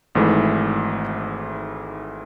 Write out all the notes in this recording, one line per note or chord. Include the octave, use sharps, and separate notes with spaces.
G#1 G#2 E3 A3